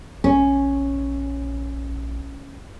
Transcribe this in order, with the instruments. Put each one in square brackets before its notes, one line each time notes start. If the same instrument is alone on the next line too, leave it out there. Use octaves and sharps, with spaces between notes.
[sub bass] A#1 [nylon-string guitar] C#4